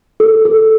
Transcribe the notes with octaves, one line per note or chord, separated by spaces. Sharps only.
A4
A4